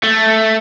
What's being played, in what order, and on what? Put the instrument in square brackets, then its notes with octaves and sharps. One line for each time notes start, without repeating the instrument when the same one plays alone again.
[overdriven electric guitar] A3